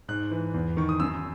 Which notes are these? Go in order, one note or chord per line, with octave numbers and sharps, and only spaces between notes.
G#2 F#6
E3
E2
D#3 C#6
D#6
F#2 E6